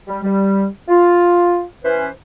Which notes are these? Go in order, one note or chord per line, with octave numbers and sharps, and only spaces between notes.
G3
G3
F4
E3 C#4 B4 C5